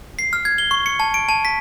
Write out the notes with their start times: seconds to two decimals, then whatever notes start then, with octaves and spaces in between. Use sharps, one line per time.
0.19 C7
0.33 F6
0.45 G#6
0.58 G7
0.71 C#6
0.86 C#7
1.00 A5
1.14 D7
1.29 A5
1.45 B6